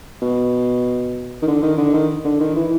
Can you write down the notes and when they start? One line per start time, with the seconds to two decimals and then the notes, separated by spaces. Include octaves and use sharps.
0.22 B2
1.42 D#3
1.47 D3
1.62 D#3
1.78 D3
1.94 D#3
2.24 D3
2.40 D#3
2.56 E3